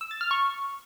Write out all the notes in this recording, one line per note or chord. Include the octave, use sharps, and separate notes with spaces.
E6
A6
F6
C#6